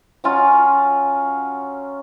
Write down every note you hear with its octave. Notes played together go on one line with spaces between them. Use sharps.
F#3 C#4 F4